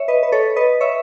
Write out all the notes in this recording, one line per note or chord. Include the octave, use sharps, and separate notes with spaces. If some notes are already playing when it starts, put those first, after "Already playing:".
Already playing: C#5 E5
B4 D#5
B4
A4 C#5
B4 D#5
C#5 E5